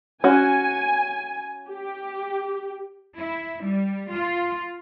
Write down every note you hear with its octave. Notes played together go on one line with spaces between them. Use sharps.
C#4 F#4 G#5
G4
E4
G3
F4